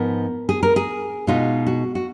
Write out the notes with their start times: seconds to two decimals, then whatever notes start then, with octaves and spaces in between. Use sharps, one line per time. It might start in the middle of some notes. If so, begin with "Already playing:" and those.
Already playing: G#2 F3 B3 A#4
0.49 G#4
0.63 A#4
0.76 G#4
1.27 B2 G#3 B3 D#4 F4
1.67 F#4
1.95 F#4